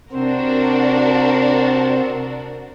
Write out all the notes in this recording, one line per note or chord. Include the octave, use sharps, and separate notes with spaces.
C3 C4 D4 F#4 A#4 C5